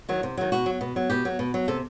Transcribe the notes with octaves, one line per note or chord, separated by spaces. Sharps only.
D#3 F#3
C3
D#3 F#3
B2 F#4
F#3
B2
F#3
B2 G4
F#3
B2
F#3
C3 A4